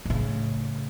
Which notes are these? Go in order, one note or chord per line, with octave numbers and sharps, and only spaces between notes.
A2 C#3